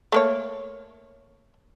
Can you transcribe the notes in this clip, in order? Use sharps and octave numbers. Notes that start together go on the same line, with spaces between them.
A3 A#3 C#5